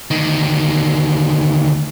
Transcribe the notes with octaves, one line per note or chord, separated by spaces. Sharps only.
D2 D#3